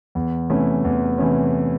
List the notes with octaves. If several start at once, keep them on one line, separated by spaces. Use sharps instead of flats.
E2
C3 E3 A3 C#4
E2
C3 E3 A3 C#4